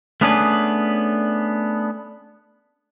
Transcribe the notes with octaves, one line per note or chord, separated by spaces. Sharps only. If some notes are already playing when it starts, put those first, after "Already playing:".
A3 B3 C#4 D4 G#4 B4